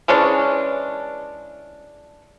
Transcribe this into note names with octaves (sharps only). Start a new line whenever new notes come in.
E3 G#3 C#4 D4